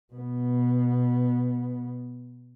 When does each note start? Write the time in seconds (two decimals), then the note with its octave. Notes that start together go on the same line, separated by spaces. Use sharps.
0.14 B2 B3